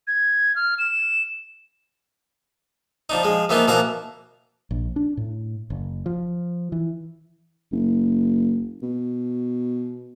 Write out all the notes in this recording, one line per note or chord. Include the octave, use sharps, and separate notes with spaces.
G#6
F6
E7
F3 D4 D#4
F3 G#3
E3 F3 A#3 B3 D#4 F4
B2 E3 F3 A#3 F#5 A#5
A#1
D4
A2
F#1
F3
E3
F#1
B2